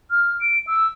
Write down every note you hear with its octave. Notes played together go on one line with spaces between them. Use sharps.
F6
D7
E6